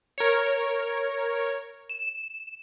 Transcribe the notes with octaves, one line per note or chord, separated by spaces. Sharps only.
A#4 C#5
E7